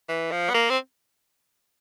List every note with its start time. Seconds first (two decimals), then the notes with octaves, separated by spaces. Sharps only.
0.09 E3
0.32 F3
0.50 B3
0.54 A#3
0.70 C4